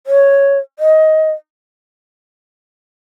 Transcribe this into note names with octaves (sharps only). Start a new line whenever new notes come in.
C#5
D#5